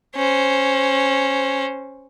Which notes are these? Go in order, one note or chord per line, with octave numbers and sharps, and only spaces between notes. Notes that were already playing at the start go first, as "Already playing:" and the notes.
C#4 C5